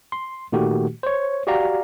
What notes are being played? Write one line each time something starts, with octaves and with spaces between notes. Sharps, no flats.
C6
A#2 D#3 A3 F#4 G4
C5 C#5
F#4 G4 D5 F5 A#5